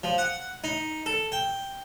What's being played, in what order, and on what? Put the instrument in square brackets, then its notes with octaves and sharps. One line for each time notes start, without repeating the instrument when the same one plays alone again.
[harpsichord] F3
F#5
D#4
A4
G5